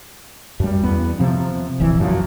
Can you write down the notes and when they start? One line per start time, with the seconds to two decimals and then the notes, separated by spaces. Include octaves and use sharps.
0.60 F#2 G3
0.83 E2 B3
1.19 C3 F3 C4
1.80 D1 A#1 E3
2.00 F#2 F3 F#3